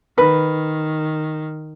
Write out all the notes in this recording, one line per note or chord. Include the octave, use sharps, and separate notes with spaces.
D#3 B4